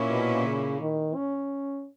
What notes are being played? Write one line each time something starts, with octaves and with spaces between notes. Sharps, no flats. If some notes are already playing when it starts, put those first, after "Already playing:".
Already playing: A#2 A#3 C#4 E4
B2
C#3
D#3
C#4